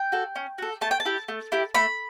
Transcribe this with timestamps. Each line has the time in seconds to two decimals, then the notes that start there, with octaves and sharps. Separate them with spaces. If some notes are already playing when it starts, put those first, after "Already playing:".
Already playing: G5
0.12 F#4 A4
0.36 C#4
0.58 F#4 A4
0.81 A3 A5
0.91 G5
1.00 A5
1.05 E4 G4
1.28 A3
1.52 E4 G4
1.74 A3 B5